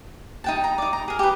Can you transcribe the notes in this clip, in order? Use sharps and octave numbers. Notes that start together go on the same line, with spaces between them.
D#4 G5 A5
A#5
D#4 D5
A#5
G#4 A#4
G4 B4